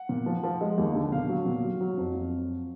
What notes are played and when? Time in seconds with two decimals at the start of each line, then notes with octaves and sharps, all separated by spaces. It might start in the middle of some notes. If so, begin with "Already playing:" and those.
Already playing: F#5
0.09 A#2
0.26 F3
0.43 F3
0.61 G#3
0.78 D#2
0.95 D3
1.12 A#2 F5
1.29 F#3
1.46 A#2
1.64 F#3
1.81 F#3
1.97 F2
2.15 F2